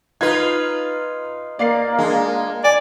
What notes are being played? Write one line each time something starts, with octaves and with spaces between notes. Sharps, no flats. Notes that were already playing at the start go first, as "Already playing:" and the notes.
D#4 F4 B4 G#6
A#3 D5 F5 C7
G#3 D4
D5 G#5